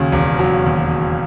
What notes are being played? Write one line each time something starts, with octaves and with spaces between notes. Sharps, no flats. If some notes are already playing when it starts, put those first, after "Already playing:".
Already playing: D#2 C#3 F#3
E1
F#3
D#2